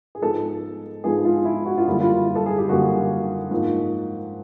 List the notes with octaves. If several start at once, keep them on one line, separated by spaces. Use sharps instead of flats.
G#4
G#2 F3 G#3 B3 A4
G#2 F3 G#3 B3 G#4
F4
E4
F#4
F4
F#2 D3 G3 A#3 E4
F4
A4
G#4
G4
F#2 D3 G3 A#3 F#4
G#2 F3 A#3